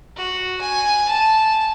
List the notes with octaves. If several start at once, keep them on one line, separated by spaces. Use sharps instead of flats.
F#4
G#5
A5